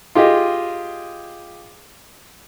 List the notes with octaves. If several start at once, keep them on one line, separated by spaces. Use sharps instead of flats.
F4 G4 G#4 D#5